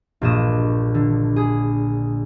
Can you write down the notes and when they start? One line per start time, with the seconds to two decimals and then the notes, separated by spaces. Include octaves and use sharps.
0.21 A#1 G2 A#2 D#5 E7
0.94 D3
1.36 G#4